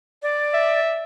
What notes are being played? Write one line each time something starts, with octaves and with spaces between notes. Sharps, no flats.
D5
E5